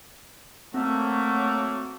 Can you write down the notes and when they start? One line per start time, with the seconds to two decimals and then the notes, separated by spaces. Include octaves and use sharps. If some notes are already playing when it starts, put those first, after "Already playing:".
0.74 F#3 A3 A#3 C4